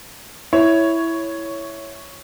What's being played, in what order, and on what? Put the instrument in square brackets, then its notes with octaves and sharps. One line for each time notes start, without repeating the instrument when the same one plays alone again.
[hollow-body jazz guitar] E4 [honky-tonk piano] C#5